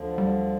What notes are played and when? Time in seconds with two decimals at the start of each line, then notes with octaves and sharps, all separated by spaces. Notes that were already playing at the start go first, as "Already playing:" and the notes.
Already playing: D2 D3 F3
0.18 G3